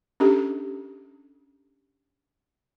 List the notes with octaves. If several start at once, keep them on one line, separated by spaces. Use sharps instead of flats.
C#4 D4 G4 A4